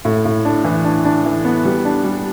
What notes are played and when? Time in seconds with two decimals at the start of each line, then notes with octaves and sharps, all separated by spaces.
0.05 A2
0.25 A2
0.45 D4
0.64 E3
0.85 D4
1.05 D4
1.25 E3
1.45 B3
1.65 G3
1.85 D4
2.05 G3